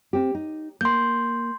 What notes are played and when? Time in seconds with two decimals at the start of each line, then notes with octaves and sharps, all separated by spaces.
0.13 C4 G4
0.35 D#4
0.81 A#3 C6 G6